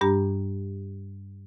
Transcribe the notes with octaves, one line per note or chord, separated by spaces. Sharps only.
G2 G3 D4 G4 A#5